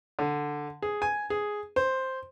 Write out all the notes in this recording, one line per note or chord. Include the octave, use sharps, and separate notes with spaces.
D3
G#4
G#5
G#4
C5